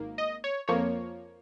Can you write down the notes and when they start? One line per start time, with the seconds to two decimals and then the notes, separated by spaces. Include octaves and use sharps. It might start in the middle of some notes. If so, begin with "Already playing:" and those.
Already playing: G#1 D#3 A#3
0.18 D#5
0.44 C#5
0.68 F2 F3 A#3 C#5